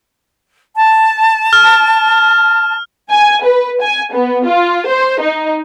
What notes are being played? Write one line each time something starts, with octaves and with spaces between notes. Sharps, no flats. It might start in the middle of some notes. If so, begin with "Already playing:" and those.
A5
F6
G#5
B4
G#5
B3
F4
C5
D#4